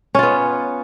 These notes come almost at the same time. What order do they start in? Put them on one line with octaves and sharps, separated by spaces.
C#4 F4 B3